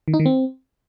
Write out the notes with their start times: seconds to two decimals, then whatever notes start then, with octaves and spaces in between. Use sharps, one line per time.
0.08 D#3
0.14 D#4
0.20 D#3
0.26 C4